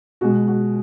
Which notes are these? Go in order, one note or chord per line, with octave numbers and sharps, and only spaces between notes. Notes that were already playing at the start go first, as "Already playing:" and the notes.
B2 G#3 F#4
F#4